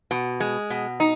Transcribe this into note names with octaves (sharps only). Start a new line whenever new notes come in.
B2
G#3
B2
D#4